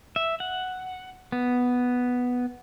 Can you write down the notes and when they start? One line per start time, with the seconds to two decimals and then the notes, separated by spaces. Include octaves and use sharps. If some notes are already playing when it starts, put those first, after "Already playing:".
0.16 E5
0.40 F#5
1.32 B3